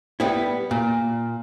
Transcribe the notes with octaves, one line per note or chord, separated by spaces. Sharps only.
G3 B3 E4
A#2